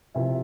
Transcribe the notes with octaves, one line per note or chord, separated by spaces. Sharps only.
C3 F3 E4